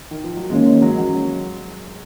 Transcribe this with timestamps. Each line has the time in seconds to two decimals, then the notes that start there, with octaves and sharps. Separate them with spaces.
0.11 D#3
0.24 F3
0.37 F#3
0.50 D#3 G#3 A#3 C#4
0.66 G#3
0.82 F#3
0.98 F#3